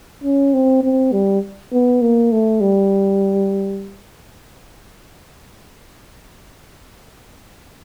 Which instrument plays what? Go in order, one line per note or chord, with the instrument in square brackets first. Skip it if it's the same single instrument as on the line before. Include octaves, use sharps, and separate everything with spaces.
[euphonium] C#4
C4
C4
G3
B3
A#3
A3
G3